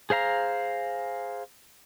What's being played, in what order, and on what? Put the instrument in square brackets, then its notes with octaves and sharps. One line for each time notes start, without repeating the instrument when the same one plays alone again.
[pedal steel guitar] G#4 C5 F5 A#5